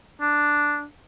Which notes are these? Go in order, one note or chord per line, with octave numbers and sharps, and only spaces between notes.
D4